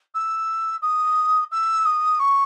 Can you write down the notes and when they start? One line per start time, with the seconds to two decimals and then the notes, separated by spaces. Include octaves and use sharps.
0.14 E6
0.82 D#6
1.52 E6
1.85 D#6
2.19 C#6